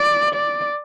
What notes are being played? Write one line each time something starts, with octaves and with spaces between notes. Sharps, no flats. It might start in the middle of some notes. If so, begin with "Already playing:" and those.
Already playing: D5
D5